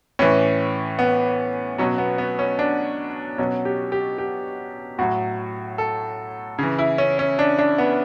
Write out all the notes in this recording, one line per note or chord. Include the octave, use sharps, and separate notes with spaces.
A2 E3 C#4
B3
B2 F#3 C#4
B3
B3
C#4
D4
B2 F#3 C#4
G4
G4
G4
A2 F#3 F#4
A4
C#3 E3
E4
C#4
C#4
D4
D4
B3